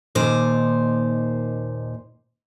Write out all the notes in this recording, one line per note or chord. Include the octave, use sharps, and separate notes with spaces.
D#2 A#2 D#4 C5 D5